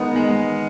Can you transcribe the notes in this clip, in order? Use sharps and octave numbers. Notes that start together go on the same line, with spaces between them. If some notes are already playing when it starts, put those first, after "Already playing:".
Already playing: G#3 B3 D#4 A#4
G#3